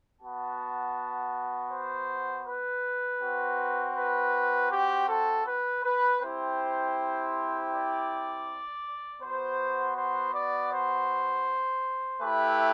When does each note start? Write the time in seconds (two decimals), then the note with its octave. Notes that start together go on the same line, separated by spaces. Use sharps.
0.20 B3 F#4 A5
1.71 C5
2.46 B4
3.20 C4 F#4
3.95 B4
4.71 G4
5.08 A4
5.46 B4
5.83 B4
6.21 C4 E4 G4 C5
7.72 D5
9.21 B3 F#4 C5
9.96 C5
10.34 D5
10.73 C5
12.22 A3 E4 G4 B4